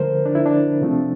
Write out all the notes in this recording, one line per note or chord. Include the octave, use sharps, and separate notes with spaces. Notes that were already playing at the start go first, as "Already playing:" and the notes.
Already playing: D3 F3 A3 A#4 C5
D4
E4
D4
C3 F3 A3 C4